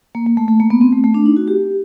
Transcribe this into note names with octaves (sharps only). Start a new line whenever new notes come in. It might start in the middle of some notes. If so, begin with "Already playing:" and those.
A#3
A#3
A3
A3
A#3
B3
C4
A3
A3
D4
D#4
F#4
G4